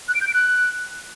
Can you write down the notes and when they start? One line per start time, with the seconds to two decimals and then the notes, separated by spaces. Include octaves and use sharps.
0.08 F#6
0.14 D7
0.21 G6
0.27 D7
0.33 F#6